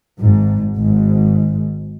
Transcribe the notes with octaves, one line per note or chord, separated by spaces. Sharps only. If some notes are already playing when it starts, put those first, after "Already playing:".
G#1 G#2
G#1 G#2